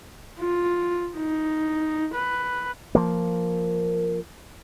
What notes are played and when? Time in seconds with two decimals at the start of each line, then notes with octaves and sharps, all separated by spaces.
0.40 F4
1.17 D#4
2.14 B4
2.95 F3 A#3